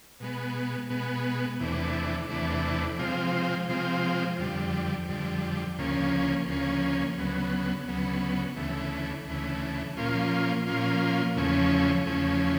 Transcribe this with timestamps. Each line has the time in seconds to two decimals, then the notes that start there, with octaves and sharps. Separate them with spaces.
0.20 B2 G#3 B3
0.90 B2 G#3 B3
1.60 E2 C3 E3 A3 D4
2.29 E2 C3 E3 A3 D4
2.99 C3 F3 G#3 C4 F4
3.68 C3 F3 G#3 C4 F4
4.39 F2 D3 G3
5.08 F2 D3 G3
5.78 D2 C#3 F3 A#3 C#4
6.48 D2 C#3 F3 A#3 C#4
7.17 D2 C#3 F#3 B3
7.88 D2 C#3 F#3 B3
8.57 D2 C#3 E3 A3
9.27 D2 C#3 E3 A3
9.97 A#2 F3 A#3 C#4 F4
10.67 A#2 F3 A#3 C#4 F4
11.36 E2 C#3 F3 A3 C#4
12.05 E2 C#3 F3 A3 C#4